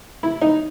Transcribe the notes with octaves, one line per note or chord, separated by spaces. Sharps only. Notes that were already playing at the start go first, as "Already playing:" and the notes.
E4
D#4